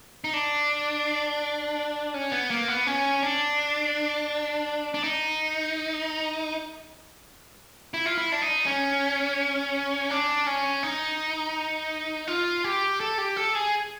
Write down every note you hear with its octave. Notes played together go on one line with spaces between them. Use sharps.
D#4
D4
C#4
B3
A#3
B3
C#4
D4
D4
D#4
E4
F4
E4
D4
D#4
C#4
D4
C#4
D#4
F4
G4
A4
G4
A4
G#4